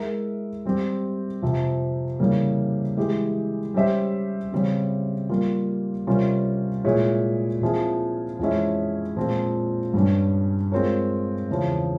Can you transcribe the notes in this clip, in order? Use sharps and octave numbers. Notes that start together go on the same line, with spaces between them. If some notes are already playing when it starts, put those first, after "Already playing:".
Already playing: G#3 E4 A#4 E5
G3 C4 G4
F2 C3 F3
C#3 E3 G3 A#3
E3 G#3 E4 G4
G3 C#4 G4 C5 E5
C#3 G3 C4
G3 A#3 F4
C3 G3 C#4 F4 A#4
A#2 G#3 E4 G#4 C#5
A#2 F3 C4 E4 G#4
F2 E3 G#3 C#4 E4
A#2 F3 G#3 C4
G2 G3 C#4
G#3 C4 F4 A#4 C#5
E2 C#3 F3